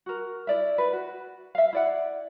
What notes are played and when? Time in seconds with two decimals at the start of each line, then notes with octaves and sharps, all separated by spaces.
0.06 F#4 A#4
0.47 E4 D5 E5
0.78 B4
0.93 F#4
1.55 E5 F5
1.73 E4 D5 F#5